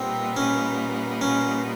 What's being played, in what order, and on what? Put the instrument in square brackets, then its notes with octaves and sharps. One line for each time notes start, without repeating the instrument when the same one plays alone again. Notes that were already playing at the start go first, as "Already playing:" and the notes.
Already playing: [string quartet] A#2 G3 B3 D#4 [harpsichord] C4
[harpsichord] C#4
C#4